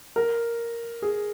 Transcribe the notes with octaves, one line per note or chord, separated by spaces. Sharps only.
A#4
G#4